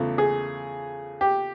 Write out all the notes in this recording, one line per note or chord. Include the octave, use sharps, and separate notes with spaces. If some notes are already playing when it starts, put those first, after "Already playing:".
Already playing: E2 C#3 F3 A3
G#4
G4